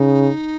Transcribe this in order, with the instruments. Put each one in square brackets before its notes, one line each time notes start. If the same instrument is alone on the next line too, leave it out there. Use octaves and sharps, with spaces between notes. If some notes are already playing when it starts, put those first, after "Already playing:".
Already playing: [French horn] C#3 [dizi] D#4